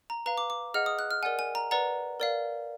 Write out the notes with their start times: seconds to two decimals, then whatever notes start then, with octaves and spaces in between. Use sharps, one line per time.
0.10 A#5
0.26 B4 F5 A#5
0.38 D6
0.50 D6
0.74 G#4 D#5 F#5 F6
0.86 D#6
0.99 F#6
1.11 F6
1.23 A#4 D5 F#5 G#5
1.39 G#5
1.55 A#5
1.71 B4 D5 F#5 A#5
2.20 A#4 D5 F5